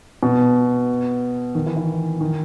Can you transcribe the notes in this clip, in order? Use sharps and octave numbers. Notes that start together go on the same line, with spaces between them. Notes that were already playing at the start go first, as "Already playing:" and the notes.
B2
D#3
E3
E3
D#3